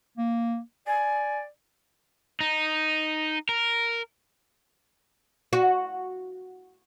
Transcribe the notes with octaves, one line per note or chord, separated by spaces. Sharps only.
A#3
D5 G#5
D#4
A#4
F#4